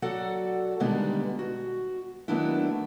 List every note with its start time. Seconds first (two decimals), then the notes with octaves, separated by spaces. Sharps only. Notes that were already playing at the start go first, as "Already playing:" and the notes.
0.02 F#3 F#4 A4 D5 F#5
0.80 B2 D3 D#3 G3 G#3 B3
1.39 F#4
2.28 D#3 F#3 A3 B3 D4 E4